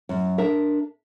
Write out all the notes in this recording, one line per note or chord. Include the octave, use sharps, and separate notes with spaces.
F#2
D4 A#4 E5